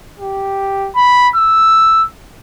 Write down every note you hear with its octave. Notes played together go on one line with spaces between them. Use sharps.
G4
B5
E6